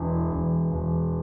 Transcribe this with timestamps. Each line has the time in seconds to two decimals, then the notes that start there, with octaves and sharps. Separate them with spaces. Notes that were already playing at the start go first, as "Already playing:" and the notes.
Already playing: E1 E3
0.31 E1
0.71 E1